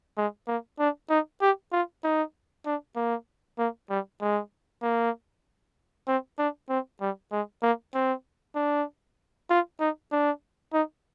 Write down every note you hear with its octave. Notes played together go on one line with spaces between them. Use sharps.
G#3
A#3
D4
D#4
G4
F4
D#4
D4
A#3
A#3
G3
G#3
A#3
C4
D4
C4
G3
G#3
A#3
C4
D4
F4
D#4
D4
D#4